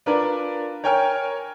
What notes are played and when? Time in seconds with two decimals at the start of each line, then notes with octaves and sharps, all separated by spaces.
0.06 D4 F4 A#4 B4 D5
0.84 A#4 C#5 G5 G#5 F6